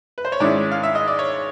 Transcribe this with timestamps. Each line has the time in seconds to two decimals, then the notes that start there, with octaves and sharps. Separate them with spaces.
0.18 B4
0.25 C5
0.32 C#5
0.40 G#2 D#3 G#3 C#4 E4 D5
0.72 F5
0.83 E5
0.95 D#5
1.08 D5
1.19 C#5